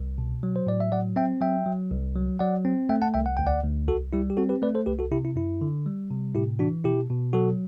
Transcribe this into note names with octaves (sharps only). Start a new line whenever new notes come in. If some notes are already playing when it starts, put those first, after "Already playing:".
Already playing: C2
B2
F#3
C5
A2 D5
E5
F#3 D5 F#5
C4 E5 G5
F#3 E5 G5
F#3
C2
F#3
F#3 D5 F#5
C4
A3 E5 G5
F#5 A5
C2 E5 G5
F#5
D2 G5
D5 F#5
D2
C2 F#4 A4
G3 E4 G4
G4
C4 F#4 A4
G4 B4
A3 B4 D5
A4 C5
C2 G4 B4
F#4 A4
C3 E4 G4
E4
F#2 E4
D3
G3
C3
A2 E4 G4
E3 D4 F#4
B2 E4 G4
B2
F#3 F#4 A4